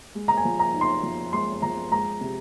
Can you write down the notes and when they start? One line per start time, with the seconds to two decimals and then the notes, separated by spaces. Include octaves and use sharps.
0.15 G#3
0.28 A#5
0.37 G#5
0.45 F3
0.59 A#5
0.74 D#4
0.81 C6
1.03 F3
1.33 G#3 C6
1.62 F3 A#5
1.91 G#3 A#5
2.21 C3